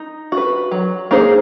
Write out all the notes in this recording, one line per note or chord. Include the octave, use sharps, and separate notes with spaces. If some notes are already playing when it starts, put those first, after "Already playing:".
Already playing: D#4
F#4
B4
F#3
A#3 D#4 G#4 C5